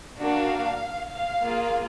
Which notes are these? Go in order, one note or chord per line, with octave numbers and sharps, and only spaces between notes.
A#3 D4 F#4 F5
F5
A#3 F4 G#4